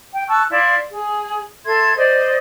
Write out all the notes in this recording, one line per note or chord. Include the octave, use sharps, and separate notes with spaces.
G5
A5 C#6 E6 F#6
E4 D5 F5 C6
G#4
A4 E5 C6 G#6
C5 D5 D#5